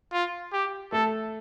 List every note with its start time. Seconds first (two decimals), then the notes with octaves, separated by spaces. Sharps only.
0.12 F4
0.53 G4
0.92 A3 A4